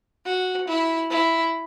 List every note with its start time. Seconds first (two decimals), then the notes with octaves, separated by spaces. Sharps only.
0.25 F#4
0.68 E4
1.10 E4